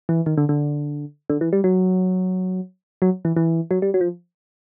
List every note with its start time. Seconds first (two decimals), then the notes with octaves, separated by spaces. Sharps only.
0.09 E3
0.26 D#3
0.37 D3
0.49 D3
1.30 D3
1.41 E3
1.53 G3
1.64 F#3
3.02 F#3
3.25 E3
3.36 E3
3.71 F#3
3.82 G3
3.94 F#3
4.01 F3